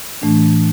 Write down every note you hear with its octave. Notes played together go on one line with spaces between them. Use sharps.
A2 E3 A3 D4